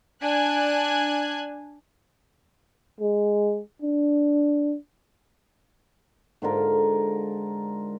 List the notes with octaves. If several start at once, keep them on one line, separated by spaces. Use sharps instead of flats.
D4 G#5 F#6 G#6
G#3
D4
G#2 D3 F4 A#4